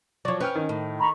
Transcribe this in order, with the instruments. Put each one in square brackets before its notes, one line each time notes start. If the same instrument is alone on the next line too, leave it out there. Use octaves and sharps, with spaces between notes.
[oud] F3 F#3 [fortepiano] C#5 D5
[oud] C#4 [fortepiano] B4 G5 F6
[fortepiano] D#3
[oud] A2
[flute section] A#5 B5 C#6